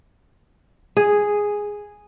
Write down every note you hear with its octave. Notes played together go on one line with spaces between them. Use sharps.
G#4